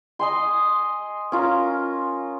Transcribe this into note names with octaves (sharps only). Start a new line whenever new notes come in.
D#5 G#5 C6
C#4 F4 A#4